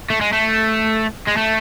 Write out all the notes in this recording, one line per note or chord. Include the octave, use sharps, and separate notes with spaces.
A3
G#3
A3
G#3
A3